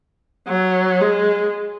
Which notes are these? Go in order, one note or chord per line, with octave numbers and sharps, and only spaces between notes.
F#3
G#3